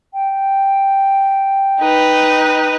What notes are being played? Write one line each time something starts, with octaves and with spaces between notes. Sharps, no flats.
G5
D#4 B4